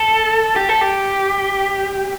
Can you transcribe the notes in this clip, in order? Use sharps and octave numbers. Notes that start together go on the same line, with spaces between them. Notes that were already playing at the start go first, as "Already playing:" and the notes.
Already playing: A4
G4
A4
G4